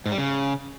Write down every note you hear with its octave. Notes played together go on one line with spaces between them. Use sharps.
G#2
G3
C#3